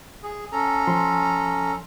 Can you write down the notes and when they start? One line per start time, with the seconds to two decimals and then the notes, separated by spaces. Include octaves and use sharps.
0.23 G#4
0.52 C#4 A4 A#5
0.87 F3 C6